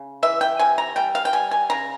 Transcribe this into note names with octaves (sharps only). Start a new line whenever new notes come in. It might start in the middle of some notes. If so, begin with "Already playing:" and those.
Already playing: C#3
E3 E5
G5
C3 G#5
A#5
G3 G5
F5
G5
G3 G#5
G#5
C#3 A#5